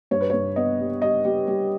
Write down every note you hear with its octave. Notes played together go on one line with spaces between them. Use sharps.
G2 C#5
B4
G2 C#5
B3 D#5
G3
G3 D#5
G3
G3